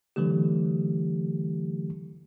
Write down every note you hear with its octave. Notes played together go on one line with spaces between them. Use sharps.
D3 E3 F#3 A3 G4